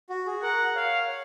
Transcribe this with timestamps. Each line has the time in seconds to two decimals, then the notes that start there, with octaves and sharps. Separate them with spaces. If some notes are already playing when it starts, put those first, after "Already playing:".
0.10 F#4
0.26 G#4
0.43 A#4 F#5
0.75 C#5 F5
1.08 C#5